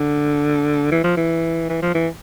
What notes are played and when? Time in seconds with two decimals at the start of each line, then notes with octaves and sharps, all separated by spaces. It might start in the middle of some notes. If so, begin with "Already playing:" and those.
Already playing: D3
0.91 E3
1.04 F3
1.17 E3
1.69 E3
1.82 F3
1.94 E3